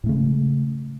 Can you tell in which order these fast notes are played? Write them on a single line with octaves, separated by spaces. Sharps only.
A2 A3 C#3 G#3